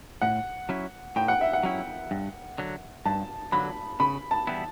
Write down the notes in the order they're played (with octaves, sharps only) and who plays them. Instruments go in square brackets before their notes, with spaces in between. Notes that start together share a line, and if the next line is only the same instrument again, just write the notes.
[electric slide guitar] A2 [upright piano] F#5
[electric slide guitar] F#3 C#4 E4
[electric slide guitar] A2 [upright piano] G5
[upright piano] F#5
E5
F#5
[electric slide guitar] F#3 C#4 E4
G2
D3 F#3
[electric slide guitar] G2 [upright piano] A5
[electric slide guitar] D3 F#3 [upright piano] B5
[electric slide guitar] C#3 [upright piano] B5
[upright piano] A5
[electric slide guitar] E3 G3 B3 E4